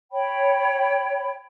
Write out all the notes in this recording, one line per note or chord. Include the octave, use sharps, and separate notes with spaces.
C#5 G5 B5